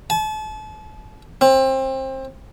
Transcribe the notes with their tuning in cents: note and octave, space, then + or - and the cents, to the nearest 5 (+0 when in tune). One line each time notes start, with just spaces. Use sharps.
A5 -35
C4 +25